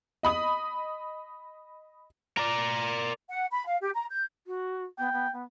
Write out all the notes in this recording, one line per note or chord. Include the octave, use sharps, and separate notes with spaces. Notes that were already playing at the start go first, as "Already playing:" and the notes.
D#5 B5 D#6
A#4 D5
F#5
B5
F5
G4
A#5
G6
F#4
B3 G5
B3
B3